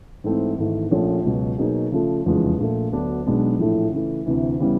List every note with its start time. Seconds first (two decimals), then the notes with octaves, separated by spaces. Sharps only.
0.24 G#2 E3 A3 C4
0.58 G#1 G#2 E3 A3
0.91 A#1 A#2 F3 A3 C#4
1.24 C#2 B2 F#3
1.58 B2 F#3 A#3 D#4 G#4
1.92 C#3 F3 A3
2.26 F1 E2 C#3 F3 G#3
2.59 A#1 A#2 F3 A3
2.92 D2 D3 F#3 B3 D4
3.26 B1 B2 G#3 B3 D4
3.59 A#1 A2 E3 A3
3.92 C#3 E3 A3
4.26 D2 C3 E3
4.60 C#3 E3 G3 B3